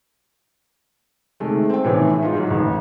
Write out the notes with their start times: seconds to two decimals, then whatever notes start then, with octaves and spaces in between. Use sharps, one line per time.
1.40 C3 D#3 G#3 A3
1.70 C4 G5
1.84 A2 C3 D#3 E3 B3
2.21 G#3 D#4 F4
2.35 G#2 D#3 F#3
2.50 A1